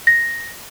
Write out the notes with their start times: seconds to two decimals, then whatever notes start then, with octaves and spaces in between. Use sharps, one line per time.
0.07 A#6